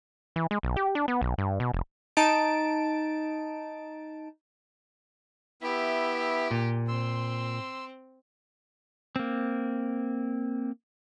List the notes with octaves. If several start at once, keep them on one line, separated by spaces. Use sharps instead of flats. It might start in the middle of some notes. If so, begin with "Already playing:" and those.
E3
G#3
B1
G4
D4
B3
B1
G2
B2
F1
D#4 A5 D7
B3 E4 G4 E5
A#2
C4 C6 E6
A#3 C4